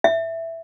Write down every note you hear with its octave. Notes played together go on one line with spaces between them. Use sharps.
E5